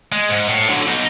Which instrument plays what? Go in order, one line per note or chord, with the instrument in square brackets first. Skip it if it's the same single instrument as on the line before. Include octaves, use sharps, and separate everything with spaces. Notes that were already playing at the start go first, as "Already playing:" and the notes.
[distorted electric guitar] G#3
G#2
A2
D3 F#3
B2 D#4